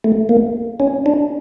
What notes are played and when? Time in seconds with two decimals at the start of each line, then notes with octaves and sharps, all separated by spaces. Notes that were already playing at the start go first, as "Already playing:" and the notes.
0.04 A3
0.29 A#3
0.80 C#4
1.06 D4